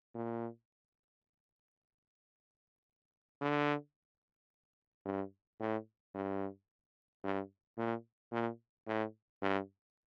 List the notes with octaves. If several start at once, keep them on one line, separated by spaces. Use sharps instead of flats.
A#2
D3
G2
A2
G2
G2
A#2
A#2
A2
G2